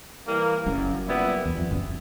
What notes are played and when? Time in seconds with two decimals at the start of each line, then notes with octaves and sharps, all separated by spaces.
0.27 E3 G3 A#3
0.66 F#1 F#2
1.06 A#2 G3 B3 E4
1.46 E2
1.58 F2
1.71 F#1 F#2